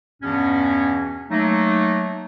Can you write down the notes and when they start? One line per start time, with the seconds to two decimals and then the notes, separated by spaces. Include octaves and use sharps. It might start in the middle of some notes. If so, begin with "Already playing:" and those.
0.23 E2 G2 B2 E3 B3 C#4
1.31 F#3 A3 A#3 D#4